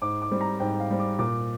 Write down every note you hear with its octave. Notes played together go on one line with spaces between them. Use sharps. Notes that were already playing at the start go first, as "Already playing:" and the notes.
G#2 D6
D6
G3 C4
A#5
G#2 G5
F5
G3 C4
D6
A#2 D6